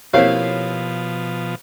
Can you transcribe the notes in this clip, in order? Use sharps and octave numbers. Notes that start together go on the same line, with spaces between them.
B2 F3 A#3 C4 E4 G4 C#5 F5